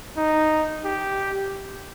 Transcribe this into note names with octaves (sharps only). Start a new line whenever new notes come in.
D#4
G4